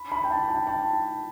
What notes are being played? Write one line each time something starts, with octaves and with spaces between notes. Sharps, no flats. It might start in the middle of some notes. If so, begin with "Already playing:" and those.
Already playing: B5
B5
G5
A5
G5
A5